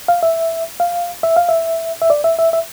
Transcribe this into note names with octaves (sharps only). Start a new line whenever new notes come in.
F5
E5
F5
E5
F5
E5
E5
D5
E5
E5
E5